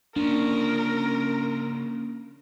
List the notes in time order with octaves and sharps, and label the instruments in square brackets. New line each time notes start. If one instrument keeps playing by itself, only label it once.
[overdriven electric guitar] C#3 F3 [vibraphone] A#3 C#4 [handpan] D4 [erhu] A#4